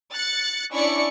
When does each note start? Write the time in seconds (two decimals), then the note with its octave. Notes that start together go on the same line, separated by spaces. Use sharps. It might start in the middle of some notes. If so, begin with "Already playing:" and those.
0.14 F#6 A6 C#7
0.72 C#4 D4 E4 D5 C#6 C#7